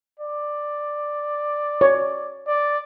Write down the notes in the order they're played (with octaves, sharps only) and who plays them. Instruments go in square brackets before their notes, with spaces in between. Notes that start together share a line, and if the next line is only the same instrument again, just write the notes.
[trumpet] D5
[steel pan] C#5
[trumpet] D5